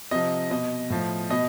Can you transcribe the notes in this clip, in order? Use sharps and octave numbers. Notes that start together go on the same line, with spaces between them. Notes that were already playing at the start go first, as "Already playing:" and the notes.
C3 F3 D#5
B2 D#5
A2 F3
B2 D#5